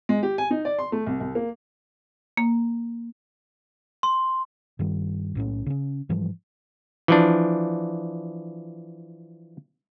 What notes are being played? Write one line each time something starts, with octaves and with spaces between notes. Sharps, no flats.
G#3
G4
G#5
D#4
D5
C6
A3
C2
C2
A#3
A#3
C6
G2 D#3 G3
B1 A2 C4 C#4
C#3 C#4
G#2 E3 F3 G3
E3 F3 D4